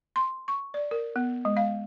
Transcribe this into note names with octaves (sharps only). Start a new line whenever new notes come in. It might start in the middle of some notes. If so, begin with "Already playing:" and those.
C6
C#6
D5
A#4
B3
G#3
F5